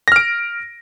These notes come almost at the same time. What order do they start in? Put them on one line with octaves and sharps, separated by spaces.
A#6 F6 D7